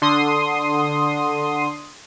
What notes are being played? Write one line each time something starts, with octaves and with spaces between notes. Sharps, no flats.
D3 C6 D#6